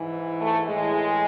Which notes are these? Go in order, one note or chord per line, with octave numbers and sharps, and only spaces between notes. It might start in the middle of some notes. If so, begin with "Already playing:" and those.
Already playing: G#2 E3
A3
A2 E3 G#3